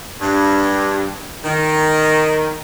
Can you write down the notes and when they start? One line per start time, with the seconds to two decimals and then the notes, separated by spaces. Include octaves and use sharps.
0.20 G2
1.44 D#3